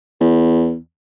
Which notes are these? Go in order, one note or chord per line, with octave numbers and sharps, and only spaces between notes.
E2